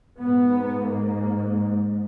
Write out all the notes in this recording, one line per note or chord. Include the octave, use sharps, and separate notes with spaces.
G#2 B3
A#3